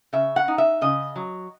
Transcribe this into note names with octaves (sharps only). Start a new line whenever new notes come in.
C#3 E5
F#5
D#4
E5
C#3 D#5
F#3